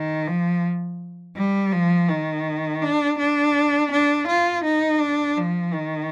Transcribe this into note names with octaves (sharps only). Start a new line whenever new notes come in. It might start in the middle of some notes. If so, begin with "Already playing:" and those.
Already playing: D#3
F3
G3
F3
D#3
D4
D4
D4
F4
D#4
D4
F3
D#3